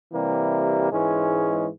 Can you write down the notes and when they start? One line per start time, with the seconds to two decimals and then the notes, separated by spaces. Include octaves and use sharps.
0.13 C3 E3 G3 A#3
0.91 G#2 E3 G#3 C#4